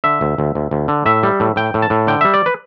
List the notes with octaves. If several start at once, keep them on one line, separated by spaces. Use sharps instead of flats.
D3 E5
D2
D2
D2
D2
D3
A2 E5
G3
A2
A2 G5
A2
A5
A2
D3 G5
G3 E5
D5
B4